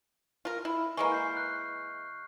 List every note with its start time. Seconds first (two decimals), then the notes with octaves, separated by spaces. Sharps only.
0.45 F4 A#4
0.65 E4
0.97 E3 G#3 A#3 C#6 F6
1.12 G6 C7
1.37 F#6